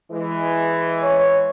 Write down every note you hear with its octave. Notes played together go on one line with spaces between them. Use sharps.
E3 G#3
C#5